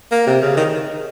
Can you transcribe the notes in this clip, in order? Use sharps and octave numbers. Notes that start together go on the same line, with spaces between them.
A#3
C3
C#3
D#3